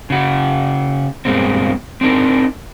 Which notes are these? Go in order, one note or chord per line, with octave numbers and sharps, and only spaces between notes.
C#3 F#4
G2 B2 G#3 A#3 C4
C4 D4 D#4 A#4